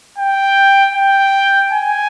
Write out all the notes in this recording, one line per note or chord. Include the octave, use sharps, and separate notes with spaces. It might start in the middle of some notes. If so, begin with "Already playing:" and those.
G5
G5
G#5